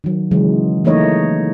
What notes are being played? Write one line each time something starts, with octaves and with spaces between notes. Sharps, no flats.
D#3 F#3
C#3 E3 F#3 G#3
E3 A3 A#3 D#4 C#5 D#5